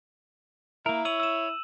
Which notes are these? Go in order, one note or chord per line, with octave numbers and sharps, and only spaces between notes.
A#3 E4 A#4
C#5 E6 D#7 F#7
E6 E7